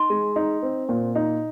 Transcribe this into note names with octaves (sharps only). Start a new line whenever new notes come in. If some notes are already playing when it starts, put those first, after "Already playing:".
Already playing: D#4 C6
G#3
D#4
C4
A#2
D#4